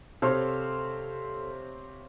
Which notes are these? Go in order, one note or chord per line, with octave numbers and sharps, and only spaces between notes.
C3 A4 C5 C#5 F5